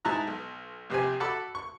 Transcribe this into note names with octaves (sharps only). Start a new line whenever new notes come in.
G#2 E4 A5 A#5 F#6
B1
A#1 C3 C4 G#5
F#4 A4 A5 B5 D6 E6
C#6